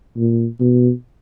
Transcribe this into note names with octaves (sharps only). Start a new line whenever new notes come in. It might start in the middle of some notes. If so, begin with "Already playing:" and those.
A#2
B2